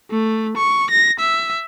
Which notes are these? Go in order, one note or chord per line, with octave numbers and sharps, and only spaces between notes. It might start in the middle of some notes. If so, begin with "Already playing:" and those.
A3
C#6
A#6
E5